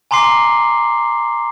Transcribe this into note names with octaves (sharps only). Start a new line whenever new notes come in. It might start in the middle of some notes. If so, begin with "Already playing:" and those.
G#5 A#5 C6 D6 C7